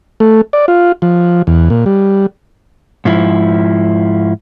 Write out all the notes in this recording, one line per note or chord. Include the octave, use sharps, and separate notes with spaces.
A3
D5
F4
F3
E2
A#2
G3
G#2 F3 E4